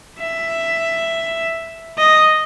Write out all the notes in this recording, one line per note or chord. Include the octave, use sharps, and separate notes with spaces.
E5
D#5